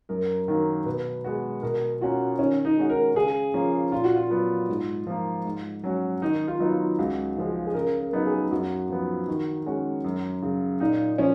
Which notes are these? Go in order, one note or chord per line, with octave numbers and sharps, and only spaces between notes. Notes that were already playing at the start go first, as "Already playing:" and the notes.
F#2 A#4
D#3 F#3 A#3
B2 B4
G#3 B3 F#4
B2 A#4
A#3 C#4 F4 F#4
D#3 C#4
D#4
G#3 C#4 F#4
A#4
C#3 G#4
F3 A#3 C#4 F4
A#2 F4
F#4
F4
F#3 B3 F#4
G#2
F3 A#3
G#2
F#3 C#4 F#4
D#3 D#4
F4
F#3 B3 D#4
F4
C#2 F#4
C#3 F3 G#3
G#4
C#3 A#4
A#4
F#3 B3 D#4
G#4
F#2 F#4
F3 B3
D#3
G#3 C#4 F#4
F#2
C#3 F#3
A#2 D#4
F3 C#4